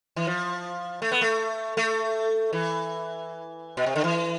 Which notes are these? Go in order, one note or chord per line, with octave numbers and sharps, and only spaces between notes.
E3
F3
A3
B3
A3
A3
E3
B2
C3
D3
E3